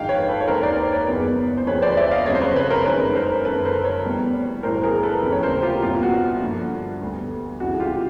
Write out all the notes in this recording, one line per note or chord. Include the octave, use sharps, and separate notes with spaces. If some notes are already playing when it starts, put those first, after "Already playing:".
Already playing: A#1 G#2 D#3 F5 G5
B4 C#5
A4 B4
C#5
D#2 D#3 G#3 A#4 C5
C5 D5
B4 C#5
F#1 E2 B2 G#3 B3
C5
D#2 D3 F3 G#3 B4 C#5
C5 D5
D5 E5
D#5 F5
G1 F2 C#3 F#3 A3 C#5 D#5
C5
B4 C#5
B4 C#5
A#4 C5
G#1 F#2 D#3 G#3 B4 C#5
A#4 C5
F#1 F#2 D3 A4 B4
A#4 C5
B4 C#5
F1 E2 B2 G3
B1 A2 E3 A#4 C5
G#4 A#4
A4 B4
F1 D#2 C#3 E3
C#5
A#4 C5
F4 G4
C2 A#2 G3 B3 F4
F#4
G2 D3 F3 A#3
D2 D3 G3 B3
C#2 C3 E3 G#3 F#4
F4 G4